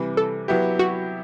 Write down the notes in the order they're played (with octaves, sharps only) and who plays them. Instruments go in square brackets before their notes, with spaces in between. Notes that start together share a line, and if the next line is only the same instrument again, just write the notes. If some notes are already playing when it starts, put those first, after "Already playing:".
Already playing: [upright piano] C3 E3 G3
[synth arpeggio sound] A4
[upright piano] F#3 B3 E4 G4
[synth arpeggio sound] F#4